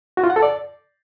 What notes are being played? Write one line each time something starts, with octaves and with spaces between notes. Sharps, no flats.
F#4
F4
F#5
A4
D5